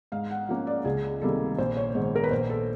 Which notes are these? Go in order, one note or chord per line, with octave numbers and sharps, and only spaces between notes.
G#2 F5
F#5
F3 A#3 C#4
D5
C#2 G#4
C3 D#3 G3 A#3 A4
A#1 C5
C#5
G#2 D#3 G#3 B3 C5
A#4
B4
A#1 C5
A4